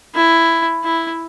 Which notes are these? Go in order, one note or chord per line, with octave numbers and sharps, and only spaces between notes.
E4
E4